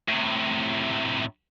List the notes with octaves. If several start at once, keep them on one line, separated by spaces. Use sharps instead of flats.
A2 C3